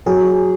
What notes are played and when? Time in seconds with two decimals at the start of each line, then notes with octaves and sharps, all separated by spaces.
0.06 F#3 G#4